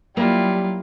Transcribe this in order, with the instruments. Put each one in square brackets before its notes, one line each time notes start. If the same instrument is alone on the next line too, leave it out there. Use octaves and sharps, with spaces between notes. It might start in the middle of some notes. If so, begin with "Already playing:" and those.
[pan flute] F#3 [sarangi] G3 [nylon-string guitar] A#3 [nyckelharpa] E4 F4